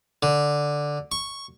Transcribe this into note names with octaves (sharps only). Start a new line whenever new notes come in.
D3
C#6